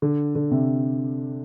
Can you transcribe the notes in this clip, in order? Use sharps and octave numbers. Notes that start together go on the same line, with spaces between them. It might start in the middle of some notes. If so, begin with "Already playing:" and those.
D3
D3
C3